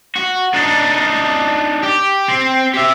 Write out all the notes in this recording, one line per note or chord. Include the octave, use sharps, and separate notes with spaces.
F#4
D4 D#4
G4
C4
G4 E5